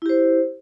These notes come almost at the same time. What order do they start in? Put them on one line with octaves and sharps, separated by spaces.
E4 G4 C5